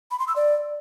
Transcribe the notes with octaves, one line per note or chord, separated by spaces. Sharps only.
B5
C6
E6
D5